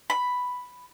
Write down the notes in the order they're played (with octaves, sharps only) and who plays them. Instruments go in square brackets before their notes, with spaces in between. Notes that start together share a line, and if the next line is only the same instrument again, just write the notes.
[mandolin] B5